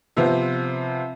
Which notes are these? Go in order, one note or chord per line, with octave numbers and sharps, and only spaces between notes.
C3 F3 B3 C4